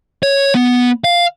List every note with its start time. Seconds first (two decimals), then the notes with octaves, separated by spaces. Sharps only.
0.23 C#5
0.55 B3
1.04 F5